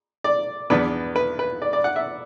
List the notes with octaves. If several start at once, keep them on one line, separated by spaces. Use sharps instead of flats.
D5
E2 E3 B3 D4 B4
B4
B4
D5
D5
F#5
E5